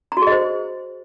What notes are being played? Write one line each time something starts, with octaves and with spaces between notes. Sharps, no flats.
A#5
F#4
G#4
D#5
C5